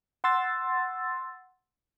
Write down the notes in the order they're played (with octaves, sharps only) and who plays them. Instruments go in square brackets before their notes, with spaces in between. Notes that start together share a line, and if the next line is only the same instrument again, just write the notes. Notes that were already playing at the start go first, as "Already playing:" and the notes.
[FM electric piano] F#5 C6 E6 A6